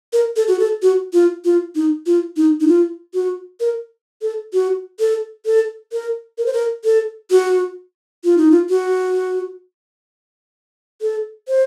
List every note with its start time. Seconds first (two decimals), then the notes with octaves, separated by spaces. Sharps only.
0.13 A#4
0.36 A4
0.48 F#4
0.60 A4
0.82 F#4
1.13 F4
1.45 F4
1.75 D#4
2.06 F4
2.37 D#4
2.61 D#4
2.68 F4
3.14 F#4
3.60 A#4
4.22 A4
4.53 F#4
5.00 A4
5.46 A4
5.92 A#4
6.38 A#4
6.46 C5
6.53 A#4
6.84 A4
7.31 F#4
8.24 F4
8.38 D#4
8.51 F4
8.70 F#4
11.01 A4
11.48 C5